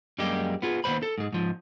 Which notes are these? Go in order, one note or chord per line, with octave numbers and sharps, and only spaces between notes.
F#2 G3 G#3 A#3 G4
B3 F4 G#4
D#2 D#3 B3 C5 B5
A4
G#2 G#3
G#2 F3